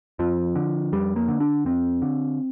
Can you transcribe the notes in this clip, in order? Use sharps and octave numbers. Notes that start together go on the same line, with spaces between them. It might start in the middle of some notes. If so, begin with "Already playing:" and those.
F2 F3
D3
F2 G3
A#3
D3
D4
F2 C4
D3